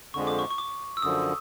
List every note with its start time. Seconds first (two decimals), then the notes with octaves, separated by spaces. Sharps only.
0.14 F2 D3 F3 G#3 C#6
0.27 D6
0.39 C#6
0.50 C#6
0.58 D6
0.97 E6
1.02 F#2 D3 F3 D#6